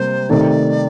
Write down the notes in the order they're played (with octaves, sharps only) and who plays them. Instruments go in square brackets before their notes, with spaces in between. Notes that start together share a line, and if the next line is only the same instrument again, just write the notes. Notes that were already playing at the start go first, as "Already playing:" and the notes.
Already playing: [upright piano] C3 G3 A#3 [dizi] C5
[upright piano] C3 D#3 A3 [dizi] D5